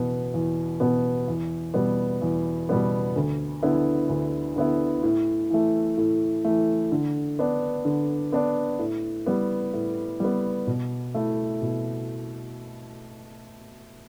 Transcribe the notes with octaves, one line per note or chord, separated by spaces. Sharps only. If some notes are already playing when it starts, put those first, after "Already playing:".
Already playing: E2 B2 B3
E2
B2 B3
E2
B2 G3 B3
E2
B2 G3 B3
D2
D3 B3 E4
D2
D3 B3 E4
A2
E3 A3
A2
E3 A3
D3
B3 D4
D3
B3 D4
A2
G3 B3
A2
G3 B3
B2
A3 E4
B2